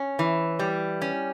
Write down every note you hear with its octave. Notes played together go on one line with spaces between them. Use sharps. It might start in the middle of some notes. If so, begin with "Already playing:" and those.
Already playing: C#4
E3
G3
C#4